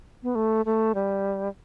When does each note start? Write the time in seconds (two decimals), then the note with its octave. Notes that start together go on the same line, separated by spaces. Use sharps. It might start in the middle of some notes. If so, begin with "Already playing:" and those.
0.23 B3
0.35 A3
0.65 A3
0.95 G3